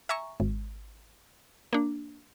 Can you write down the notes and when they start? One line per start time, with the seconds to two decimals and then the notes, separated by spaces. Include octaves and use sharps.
0.09 E5 G#5 A#5 C#6
0.40 G#1
1.73 A#3 D4